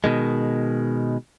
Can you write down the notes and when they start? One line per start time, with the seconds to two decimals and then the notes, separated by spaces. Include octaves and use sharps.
0.04 B2 D#3 G#3